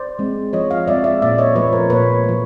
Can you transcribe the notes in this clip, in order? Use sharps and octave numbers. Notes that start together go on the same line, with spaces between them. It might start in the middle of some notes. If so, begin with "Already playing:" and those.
Already playing: C5 D5
G#3 C4
F3 C#5 D#5
D#5 F5
G#3 C4 D5 E5
D5 E5
A#2 D5 E5
C#5 D#5
F3 A3 B4 C#5
A#4 C5
A#2 B4 C#5
A3
F3